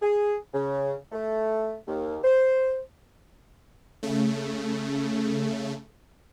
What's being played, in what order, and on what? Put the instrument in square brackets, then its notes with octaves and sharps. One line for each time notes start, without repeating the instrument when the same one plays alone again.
[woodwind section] G#4
C#3
A3
D#2
C5
[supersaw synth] C#3 A3